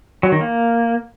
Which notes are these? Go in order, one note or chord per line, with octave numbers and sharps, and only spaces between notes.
F#3
D#3
A#3